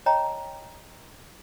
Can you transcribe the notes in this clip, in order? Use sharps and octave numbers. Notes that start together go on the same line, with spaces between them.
C#5 D#5 G5 A5 A#5